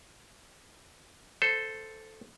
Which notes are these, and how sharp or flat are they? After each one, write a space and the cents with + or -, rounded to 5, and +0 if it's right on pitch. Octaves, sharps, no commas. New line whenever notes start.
A4 +0 C5 -10